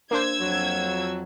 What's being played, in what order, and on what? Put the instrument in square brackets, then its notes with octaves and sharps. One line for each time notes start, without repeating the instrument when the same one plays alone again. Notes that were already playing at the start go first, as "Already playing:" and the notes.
[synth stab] A#3 D4 C5 [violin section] E6 G#6
[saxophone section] F2 F#3